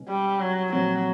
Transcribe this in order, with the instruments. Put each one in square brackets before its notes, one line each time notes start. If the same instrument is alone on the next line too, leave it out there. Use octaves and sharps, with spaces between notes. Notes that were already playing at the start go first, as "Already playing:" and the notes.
Already playing: [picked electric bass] B2 G#3 C#4
[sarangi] G3
F#3
[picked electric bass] A#2 F3 A3 C4 [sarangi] F#3